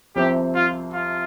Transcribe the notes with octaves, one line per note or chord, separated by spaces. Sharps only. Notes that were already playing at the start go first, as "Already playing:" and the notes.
C2 C3 F3 C4 G4
F4
F4